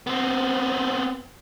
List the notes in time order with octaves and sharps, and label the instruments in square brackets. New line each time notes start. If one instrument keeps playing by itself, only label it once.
[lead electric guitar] B3 C4